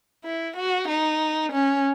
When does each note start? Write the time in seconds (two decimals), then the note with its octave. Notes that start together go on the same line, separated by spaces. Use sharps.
0.24 E4
0.57 F#4
0.88 D#4
1.52 C#4